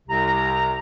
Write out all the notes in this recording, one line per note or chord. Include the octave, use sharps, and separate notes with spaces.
C2 C3 A#5